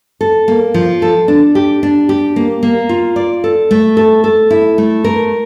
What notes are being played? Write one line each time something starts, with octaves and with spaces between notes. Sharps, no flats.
A4
A#3
F3
A4
D4
G4
D4
G4
A#3
A#3
F4
D5
A4
A3
A4
A4
E4
A3
A#4